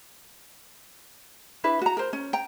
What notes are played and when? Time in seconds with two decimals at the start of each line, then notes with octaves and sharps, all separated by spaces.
1.64 D4 E4 B4
1.82 F#4 A#5
1.97 A#4 C5
2.13 C#4
2.33 G5 A#5